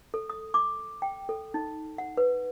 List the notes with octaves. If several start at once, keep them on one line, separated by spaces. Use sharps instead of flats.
A4
D#6
D6
G5
A4
D#4
F#5
B4